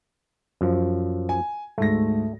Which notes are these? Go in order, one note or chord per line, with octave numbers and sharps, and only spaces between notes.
F#2 F3
G#5
D2 G#2 A3 A#6